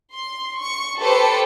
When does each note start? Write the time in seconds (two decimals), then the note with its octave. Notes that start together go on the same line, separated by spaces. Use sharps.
0.14 C6
0.60 C#6
0.99 G4 A4 B4 C5 G5 C#7